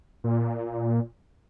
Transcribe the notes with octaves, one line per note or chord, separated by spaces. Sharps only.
A#2